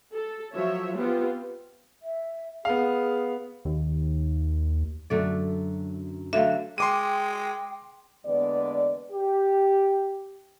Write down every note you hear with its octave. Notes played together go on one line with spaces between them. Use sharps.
A4
F3 F#3 C#5 E5
B3 C4 F4 G4
E5
B3 G#4 F5
D#2
F#2 D3 A3 D5
D3 F#3 A3 E5 F5
G#3 G5 C6 D6 D#7
E2 D3 G#3 A#3 B3 D5
G4